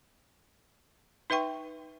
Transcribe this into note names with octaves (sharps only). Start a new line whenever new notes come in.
D#4 B4 E5 G5 C#6